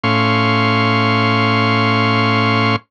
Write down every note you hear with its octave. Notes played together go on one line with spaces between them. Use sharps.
A2 C#4 F5 C6 C#6